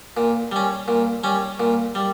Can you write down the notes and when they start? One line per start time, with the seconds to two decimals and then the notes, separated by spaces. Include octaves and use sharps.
0.17 A#2
0.52 G3 C#4
0.88 A#2
1.24 G3 C#4
1.60 A#2
1.95 G3